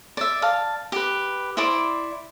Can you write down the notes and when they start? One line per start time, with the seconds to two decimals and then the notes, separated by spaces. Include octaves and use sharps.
0.17 D5 E5
0.42 F5 A5
0.92 G4 B4
1.57 E4 C5 D5 D6